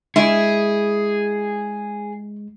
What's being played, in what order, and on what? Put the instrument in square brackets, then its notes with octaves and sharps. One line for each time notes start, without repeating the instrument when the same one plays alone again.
[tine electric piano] G#3 [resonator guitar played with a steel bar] E4 [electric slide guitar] G#4